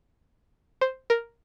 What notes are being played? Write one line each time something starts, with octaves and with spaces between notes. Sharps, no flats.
C5
A#4